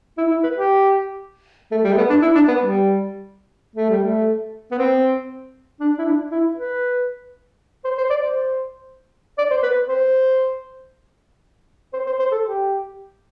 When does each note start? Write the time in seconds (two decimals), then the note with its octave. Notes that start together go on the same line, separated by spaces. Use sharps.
0.18 E4
0.31 E4
0.43 B4
0.56 G4
1.71 A3
1.84 G3
1.92 A3
1.97 B3
2.10 D4
2.22 E4
2.35 D4
2.48 B3
2.61 G3
3.75 A3
3.89 G3
4.03 A3
4.71 B3
4.78 C4
5.80 D4
5.98 E4
6.05 D4
6.31 E4
6.56 B4
7.84 C5
7.98 C5
8.10 D5
8.23 C5
9.38 D5
9.51 C5
9.63 B4
9.88 C5
11.93 C5
12.06 C5
12.19 C5
12.32 A4
12.44 G4